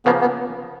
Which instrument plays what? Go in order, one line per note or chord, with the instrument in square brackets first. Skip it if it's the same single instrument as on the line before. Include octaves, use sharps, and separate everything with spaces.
[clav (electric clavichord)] C#3 F3 A#3 [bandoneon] B3
[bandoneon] B3